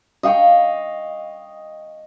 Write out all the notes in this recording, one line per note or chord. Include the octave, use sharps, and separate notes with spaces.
D#5 F5 G5 C#6